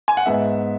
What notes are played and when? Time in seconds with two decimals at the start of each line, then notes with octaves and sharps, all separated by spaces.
0.08 G#5
0.17 F#5
0.26 G#2 G#3 B3 E5